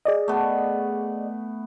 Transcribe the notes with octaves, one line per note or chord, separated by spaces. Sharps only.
G#4 D5 D#5
A3 B3